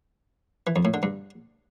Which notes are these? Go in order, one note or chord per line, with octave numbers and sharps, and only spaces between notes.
E3
F2
A2
D3
G2